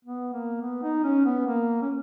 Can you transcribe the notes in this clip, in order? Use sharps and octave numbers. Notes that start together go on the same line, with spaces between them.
B3
A#3
B3
D#4
C#4
B3
A#3
C#4